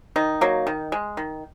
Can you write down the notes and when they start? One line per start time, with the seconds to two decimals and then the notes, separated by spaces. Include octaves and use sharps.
0.16 D#3 D#4
0.41 F#3 A#3
0.67 D#3
0.92 G#3
1.17 D#3